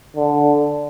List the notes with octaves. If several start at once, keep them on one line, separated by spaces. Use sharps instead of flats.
D3